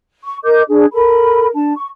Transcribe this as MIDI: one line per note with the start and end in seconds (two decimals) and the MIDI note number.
0.23 0.38 85
0.44 0.62 70
0.44 0.62 75
0.44 0.62 86
0.44 0.62 91
0.70 0.86 62
0.70 0.86 68
0.93 1.46 69
0.93 1.46 70
0.93 1.46 83
1.54 1.73 62
1.54 1.73 81
1.76 1.87 85